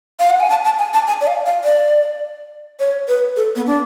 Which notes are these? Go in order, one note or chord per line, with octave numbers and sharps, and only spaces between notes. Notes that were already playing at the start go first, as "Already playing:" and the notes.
F5
F#5
G#5
A5
A5
G#5
A5
G#5
D5
F5
F5
D5
C#5
B4
A4
B3
D4